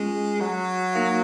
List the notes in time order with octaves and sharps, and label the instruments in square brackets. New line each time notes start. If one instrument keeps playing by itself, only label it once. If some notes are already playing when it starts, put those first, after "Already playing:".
Already playing: [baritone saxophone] G#3 [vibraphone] C#4 F4
[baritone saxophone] F#3
[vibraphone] A#3 D#4 A#4 F5